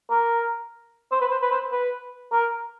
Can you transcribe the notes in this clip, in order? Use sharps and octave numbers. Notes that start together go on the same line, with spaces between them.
A#4
C5
B4
C5
B4
C5
B4
A#4